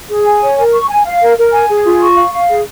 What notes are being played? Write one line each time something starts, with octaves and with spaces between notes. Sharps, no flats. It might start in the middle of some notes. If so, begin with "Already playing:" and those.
G#4
G#5
C#5
A#4
C#6
G#5
F5
A#4
A#4
G#5
G#4
F4
C#6
F5
F5
G#4